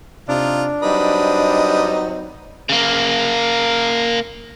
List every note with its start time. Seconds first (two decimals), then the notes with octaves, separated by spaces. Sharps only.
0.29 C3 D4 D#4 F4
0.83 F#3 G3 C4 D#4 B4 D#5
2.69 C#3 A#3